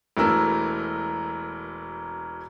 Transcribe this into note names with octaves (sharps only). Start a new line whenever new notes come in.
E1 E3 A3 A#4 E6